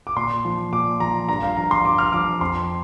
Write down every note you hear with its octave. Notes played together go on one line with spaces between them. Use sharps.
D6
A#2 C6
F3
A#2 D6
F3 A#5
G2 A#5
F5
F3 A#5
C6
G2 D6
F6
F3 D6
F2 C6